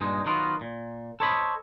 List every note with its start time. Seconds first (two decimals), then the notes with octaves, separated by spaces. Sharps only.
0.01 G2 A#2 G#3 D#4
0.26 D#3 F#3 B3 D#4 F4 A#4
0.61 A#2
1.20 A4 C5 C#5 D#5 B5